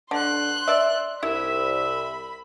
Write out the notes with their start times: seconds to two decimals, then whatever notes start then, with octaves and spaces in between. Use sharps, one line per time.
0.11 D3 C6 F#6
0.68 D5 E5
1.23 C2 E4 E5 B5